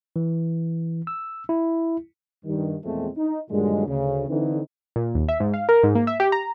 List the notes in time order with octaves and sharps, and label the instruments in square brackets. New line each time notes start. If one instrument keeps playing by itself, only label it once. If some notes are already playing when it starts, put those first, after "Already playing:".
[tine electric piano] E3
E6
E4
[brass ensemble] G2 D#3
E2 A#2 F3 G#3 A3 C4
D#4
G2 A#2 D3 D#3 F#3 G#3
D2 C#3
D3 E3 C4 D#4
[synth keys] A#2
D#2
E5
G#2
F5
A#4
G#2
A#3
E5
G4
A#5